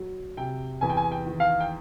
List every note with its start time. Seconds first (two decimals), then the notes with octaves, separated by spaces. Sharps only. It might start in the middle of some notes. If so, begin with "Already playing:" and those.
Already playing: F#3
0.37 C3 G5
0.81 E2 G#5
0.90 G5
0.97 G#5
1.12 G5
1.26 D#3
1.40 F5
1.60 G5